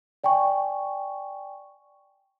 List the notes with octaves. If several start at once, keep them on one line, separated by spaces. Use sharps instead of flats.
D5 G5 G#5 C#6